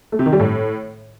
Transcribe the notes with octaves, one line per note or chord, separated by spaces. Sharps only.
A3
C3
D#3
G3
A2